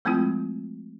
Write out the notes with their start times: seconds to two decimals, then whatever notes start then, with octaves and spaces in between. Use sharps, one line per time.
0.05 F3 G#3 A3 C4 E4 F4